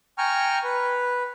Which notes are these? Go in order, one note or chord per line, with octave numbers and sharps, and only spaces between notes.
G5 G#5 A#5 C#6 F6
B4